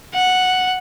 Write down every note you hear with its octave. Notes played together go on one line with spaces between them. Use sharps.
F#5